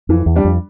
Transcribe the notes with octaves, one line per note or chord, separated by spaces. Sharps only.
F2 E3
E2
G3 D4
F2